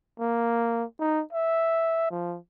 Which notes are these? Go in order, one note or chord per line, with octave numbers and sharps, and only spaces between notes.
A#3
D#4
E5
F3